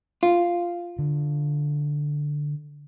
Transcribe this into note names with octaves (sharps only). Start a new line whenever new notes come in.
F4
D3